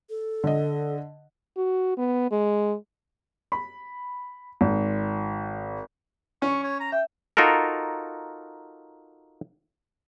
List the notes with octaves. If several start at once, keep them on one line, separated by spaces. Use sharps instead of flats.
A4
D3 D#5
F#4
B3
G#3
B5
G#1
C#4 C#6
C#5
A#5
E5 G5
D#4 F4 F#4 A4 A#4